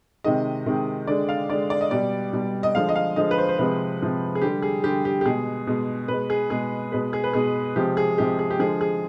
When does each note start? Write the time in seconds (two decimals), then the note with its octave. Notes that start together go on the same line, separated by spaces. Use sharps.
0.24 C3 D#3 G#3 D#5
0.66 C3 D#3 G#3
1.07 D3 G#3 D5
1.29 F5
1.49 D3 G#3 D5
1.70 D5
1.81 D#5
1.91 B2 G3 D5
2.33 B2 G3
2.63 D#5
2.75 D3 F3 G#3 F5
2.89 D#5
2.96 F5
3.16 D3 F3 G#3 D#5
3.31 B4
3.38 C5
3.49 C5
3.58 C3 F3 G#3 B4
4.00 C3 F3 G#3
4.35 G#4
4.42 D3 G3 G4
4.62 G#4
4.84 D3 G3 G4
5.05 G4
5.21 G4
5.25 B2 G#3 G#4
5.67 B2 G#3
6.08 B2 G#3 B4
6.30 G#4
6.50 B2 G#3 G#4
6.92 B2 G#3 B4
7.13 G#4
7.24 B4
7.33 B2 G#3 G#4
7.76 C3 F3 G#3 G4
7.97 G#4
8.18 C3 F3 G#3 G4
8.39 G#4
8.51 G4
8.59 D3 F3 G#3 G#4
8.81 G#4